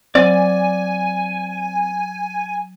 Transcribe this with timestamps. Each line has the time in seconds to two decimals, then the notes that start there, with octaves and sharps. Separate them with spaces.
0.15 F#3 C4 D5 G#5